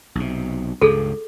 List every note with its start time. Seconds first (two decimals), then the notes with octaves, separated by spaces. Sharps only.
0.15 B1 C3
0.81 C#2 G2 C#3 G#4 A4